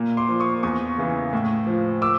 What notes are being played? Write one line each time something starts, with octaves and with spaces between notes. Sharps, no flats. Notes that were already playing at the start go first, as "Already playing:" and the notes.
Already playing: A#2
C6 D6
F3
C#6 D#6
E2 C#6 D#6
C#3 E3
A2
F3
D6 E6